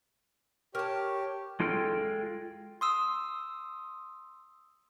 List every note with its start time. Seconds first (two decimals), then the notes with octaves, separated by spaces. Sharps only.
0.75 G4 A#4 C#5 A5
1.60 G#3 F4 A4 G5 F6
2.81 C6 D#6 E6